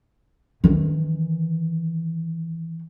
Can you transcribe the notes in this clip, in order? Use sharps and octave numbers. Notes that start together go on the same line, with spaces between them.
D#3 E3